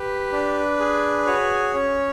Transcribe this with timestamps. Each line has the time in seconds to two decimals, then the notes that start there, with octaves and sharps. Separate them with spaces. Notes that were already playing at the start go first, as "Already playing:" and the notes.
Already playing: G4 B4
0.32 D4
0.80 G#4
1.26 F#4 C#5
1.74 C#4